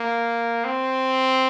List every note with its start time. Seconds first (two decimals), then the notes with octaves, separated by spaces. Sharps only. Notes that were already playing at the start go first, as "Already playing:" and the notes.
Already playing: A#3
0.65 C4